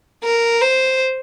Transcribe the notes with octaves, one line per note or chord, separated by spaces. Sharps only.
A#4
C5